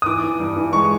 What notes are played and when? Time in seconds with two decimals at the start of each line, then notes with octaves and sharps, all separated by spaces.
0.02 D#6
0.06 E3 D6
0.23 E3
0.40 G2
0.56 E3
0.73 G#3 C#6